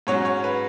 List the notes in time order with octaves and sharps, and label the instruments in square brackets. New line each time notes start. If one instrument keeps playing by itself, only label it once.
[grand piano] G#2 F#3 C#4 C#5
C#5
B4